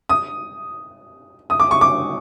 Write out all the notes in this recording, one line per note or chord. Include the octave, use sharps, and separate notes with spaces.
D#6
D#6
D6
C#6
D6